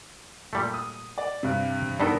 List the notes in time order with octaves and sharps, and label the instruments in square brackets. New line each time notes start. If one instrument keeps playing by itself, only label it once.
[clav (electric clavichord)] A#2 G3 A3
[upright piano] D#6
D5
G2 C3
[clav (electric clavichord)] G2 B3 A4 [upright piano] D4 D#4 A#4